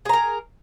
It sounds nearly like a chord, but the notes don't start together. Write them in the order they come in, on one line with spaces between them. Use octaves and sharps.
G#4 A#5 A#4